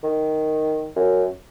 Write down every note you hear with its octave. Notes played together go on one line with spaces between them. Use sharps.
D#3
F#2